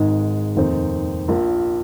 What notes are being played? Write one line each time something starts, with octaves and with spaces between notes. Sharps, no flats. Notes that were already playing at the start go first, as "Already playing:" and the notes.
Already playing: G#1 G#2 G#3 D#4 G#4
F1 D#2 D#3 C4 D#4
A#1 A#2 A#3